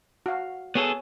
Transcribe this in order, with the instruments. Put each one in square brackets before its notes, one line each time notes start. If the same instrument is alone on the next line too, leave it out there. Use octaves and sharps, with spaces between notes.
[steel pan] F#4 F5
[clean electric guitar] B3 G#4 A4 [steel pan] C#5 G#5